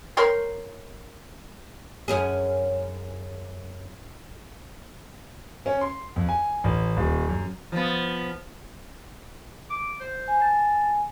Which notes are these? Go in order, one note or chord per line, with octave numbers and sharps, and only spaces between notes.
A#4 C#5 G5 C6
F#2 C#4 G#4
C#4
C6
F2
G#5
A1
D#1
F#2
F3 B3
D6
C5
G#5
A5